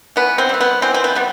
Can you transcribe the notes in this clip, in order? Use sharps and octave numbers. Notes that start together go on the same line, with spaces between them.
E3 B3
C4
G3 B3
B3
E3 C4
C4
B3
G3 B3